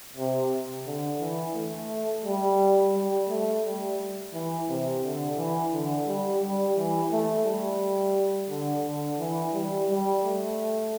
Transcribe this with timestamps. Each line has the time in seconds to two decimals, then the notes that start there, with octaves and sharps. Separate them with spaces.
0.17 C3
0.87 D3
1.21 E3
1.55 A3
2.25 G3
2.94 G3
3.29 A3
3.65 G3
4.34 E3
4.69 C3
5.03 D3
5.37 E3
5.73 D3
6.08 G3
6.42 G3
6.77 E3
7.12 A3
7.46 G3
8.50 D3
8.85 D3
9.19 E3
9.54 G3
9.89 G3
10.23 A3